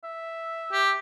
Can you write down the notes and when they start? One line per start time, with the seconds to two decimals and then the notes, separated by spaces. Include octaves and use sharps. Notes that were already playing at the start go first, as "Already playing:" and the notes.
0.04 E5
0.72 G4